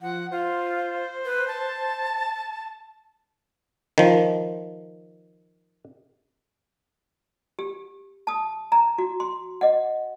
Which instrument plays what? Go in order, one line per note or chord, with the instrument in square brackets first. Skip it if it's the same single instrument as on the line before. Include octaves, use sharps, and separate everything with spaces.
[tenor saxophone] F3 [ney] F#5
[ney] F4 [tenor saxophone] C5
[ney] B4
A5
[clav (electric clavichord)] D#3 F3
[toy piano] G4
A5 D#6
A#5
F#4
C6
D#5 F#5